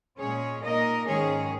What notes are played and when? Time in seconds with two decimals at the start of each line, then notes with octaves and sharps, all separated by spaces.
0.17 A#2 G#3 C#4 G#4 C#5
0.62 A#2 A#3 D#4 A#4 D#5
1.07 G#2 D#3 G#3 C#4 G#4 C#5